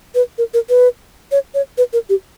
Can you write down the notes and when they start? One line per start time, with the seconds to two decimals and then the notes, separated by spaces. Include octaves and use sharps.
0.15 B4
0.38 A#4
0.54 A#4
0.69 B4
1.32 C#5
1.54 C#5
1.78 B4
1.93 A#4
2.09 G4